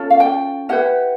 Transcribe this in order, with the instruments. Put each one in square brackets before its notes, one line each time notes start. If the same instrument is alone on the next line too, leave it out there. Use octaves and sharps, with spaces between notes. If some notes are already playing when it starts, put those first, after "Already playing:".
Already playing: [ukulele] C#4 F4 A4
F5
G5
E4 G4 B4 F#5